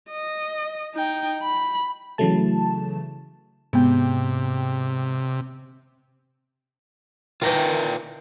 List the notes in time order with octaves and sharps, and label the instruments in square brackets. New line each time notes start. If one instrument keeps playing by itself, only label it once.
[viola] D#5
D#4 G5
B5
[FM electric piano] C#3 E3 F#3 A3 A5
[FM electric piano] G#2 G5 [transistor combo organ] C3 [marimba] B3
[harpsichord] D#3 E3 [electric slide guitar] F4 A#4 G5